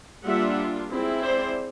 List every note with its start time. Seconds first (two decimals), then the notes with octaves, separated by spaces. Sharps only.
0.24 G3 A#3 D4 F4 E5 F#5
0.90 G#3 C4 E4
1.23 C5 D5